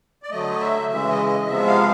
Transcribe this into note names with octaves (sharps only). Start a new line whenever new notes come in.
D5
D3 F#3 A3 D#5
E5
C#3 E3 G#3 E5
D#5
D#5
C3 F3 G#3 B3 E5
F5